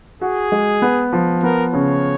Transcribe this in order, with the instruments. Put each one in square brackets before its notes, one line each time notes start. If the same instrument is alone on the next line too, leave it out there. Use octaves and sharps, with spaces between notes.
[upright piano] F#4 [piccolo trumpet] G#4
[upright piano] G#3
B3
F3
[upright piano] B3 [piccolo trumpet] A#4
[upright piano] C#3 [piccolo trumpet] C#5